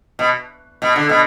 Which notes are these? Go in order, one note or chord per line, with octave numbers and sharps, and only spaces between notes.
B2
B2
D3
B2